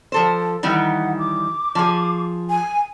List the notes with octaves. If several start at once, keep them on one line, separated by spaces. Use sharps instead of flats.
F3 A4 C5
D#3 E3 G3 F#5
D6
F3 G#4
G#5